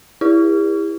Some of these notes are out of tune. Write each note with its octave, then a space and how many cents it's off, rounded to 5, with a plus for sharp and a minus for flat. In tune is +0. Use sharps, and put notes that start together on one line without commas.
E4 +0 G4 +45 A#4 +35